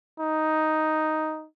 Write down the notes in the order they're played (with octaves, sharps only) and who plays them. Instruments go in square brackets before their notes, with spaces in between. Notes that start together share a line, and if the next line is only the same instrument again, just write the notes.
[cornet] D#4